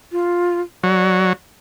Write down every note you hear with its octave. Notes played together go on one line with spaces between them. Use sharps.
F4
F#3 D5